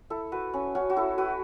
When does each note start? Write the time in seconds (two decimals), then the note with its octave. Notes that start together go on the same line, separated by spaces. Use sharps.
0.10 E4 A4
0.32 F#4 B4
0.53 C#4
0.75 C#4 F#4
0.90 F#4
0.97 E4 A4
1.18 F#4 B4